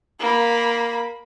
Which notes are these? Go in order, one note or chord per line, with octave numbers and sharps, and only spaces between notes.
A#3 B5